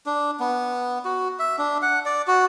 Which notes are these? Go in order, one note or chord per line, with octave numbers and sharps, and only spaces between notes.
D4
B3
F#4
E5
D4
F#5
D5
F#4